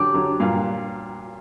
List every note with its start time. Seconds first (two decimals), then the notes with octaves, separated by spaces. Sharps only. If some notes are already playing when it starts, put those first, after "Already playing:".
Already playing: D3 F#3 G4 D5 A5
0.14 D3 F#3
0.40 G2 A#2